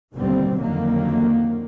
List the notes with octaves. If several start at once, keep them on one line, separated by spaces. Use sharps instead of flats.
F#1 D#2 B2 D3 G3 C4
F2 D3 D#3 F#3 A#3